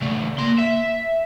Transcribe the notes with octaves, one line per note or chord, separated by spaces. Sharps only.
C#3 A3
A#3 C6
E5